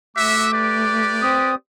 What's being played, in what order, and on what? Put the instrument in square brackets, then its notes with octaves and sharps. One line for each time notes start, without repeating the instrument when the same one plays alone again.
[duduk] A3 [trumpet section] F#4 E5 [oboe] D6
[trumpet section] G4 B4 D5
[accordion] C4 D#6